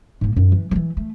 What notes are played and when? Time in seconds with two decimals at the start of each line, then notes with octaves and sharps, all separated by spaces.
0.21 G#2 A#3
0.36 F#2
0.52 E3
0.71 E3 F3
0.97 A3